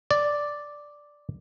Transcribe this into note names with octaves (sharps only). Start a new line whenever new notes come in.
D5